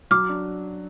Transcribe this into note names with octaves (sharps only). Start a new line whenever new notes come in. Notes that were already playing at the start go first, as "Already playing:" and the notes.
F#3 D6 F6
D4